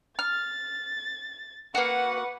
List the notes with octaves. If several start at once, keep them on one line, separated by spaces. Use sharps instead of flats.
F6 A6
A#3 F#4 B4 F#5